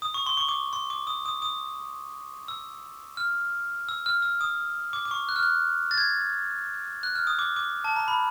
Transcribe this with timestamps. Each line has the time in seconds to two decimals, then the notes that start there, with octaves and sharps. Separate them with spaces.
0.02 D#6
0.14 C#6
0.26 C6
0.37 C#6
0.49 D6
0.73 C6
0.90 D6
1.07 D#6
1.26 D#6
1.42 D#6
2.48 E6
3.17 F6
3.89 E6
4.06 F6
4.22 E6
4.41 D#6
4.93 D6
5.05 D6
5.11 C#6
5.29 F#6
5.36 F6
5.43 F#6
5.91 A6
5.98 G#6
7.03 F#6
7.15 F6
7.27 D#6
7.39 D6
7.56 D6
7.84 A5
7.96 A#5
8.08 B5